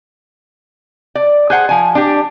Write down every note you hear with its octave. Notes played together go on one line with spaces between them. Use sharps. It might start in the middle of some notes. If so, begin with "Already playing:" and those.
D5
G#4 C5 F#5
F3 G#5
D4 G4